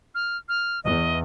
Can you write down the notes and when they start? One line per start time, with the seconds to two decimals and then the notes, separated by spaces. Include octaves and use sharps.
0.15 F6
0.49 F6
0.84 E2 D#5